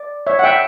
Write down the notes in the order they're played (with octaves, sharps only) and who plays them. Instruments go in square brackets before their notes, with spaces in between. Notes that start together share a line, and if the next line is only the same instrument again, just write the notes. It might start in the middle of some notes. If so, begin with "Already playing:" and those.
Already playing: [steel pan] D5
C#5 E5
F#5
E5 G5